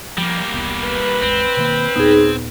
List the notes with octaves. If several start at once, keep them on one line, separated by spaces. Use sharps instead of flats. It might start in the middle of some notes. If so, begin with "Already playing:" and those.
F3 G3 A#3
E1 C2 B3
B4
G#1 E2 G#3 C4
B2 D#3 A#3
D#2 A#2 B3 D#4 G#4